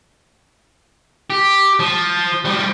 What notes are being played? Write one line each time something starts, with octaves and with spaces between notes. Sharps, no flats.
G4
F3
F3 G3